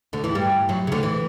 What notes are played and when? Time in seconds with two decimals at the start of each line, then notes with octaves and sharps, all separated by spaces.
0.13 D2 D3
0.24 E2 E3
0.35 G2 G3
0.69 F#2 F#3
0.87 C#3
0.92 D2 D3
1.03 E3